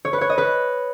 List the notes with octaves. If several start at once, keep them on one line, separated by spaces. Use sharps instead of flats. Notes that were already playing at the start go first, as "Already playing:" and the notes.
C#5
B4
C#5
D#5
B4